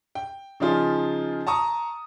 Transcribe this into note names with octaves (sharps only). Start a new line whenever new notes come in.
G5
C#3 F3 D#4 F4 G#4
A5 A#5 C#6 D#6